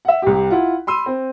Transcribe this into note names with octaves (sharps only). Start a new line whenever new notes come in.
E5 F#5
C2 G4
E4 F4 F#5
B5 C6 E6 D#7
C4